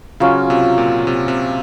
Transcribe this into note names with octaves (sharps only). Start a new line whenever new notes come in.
C#3 F#3 C#4 F4
C3
A#2
C3
C3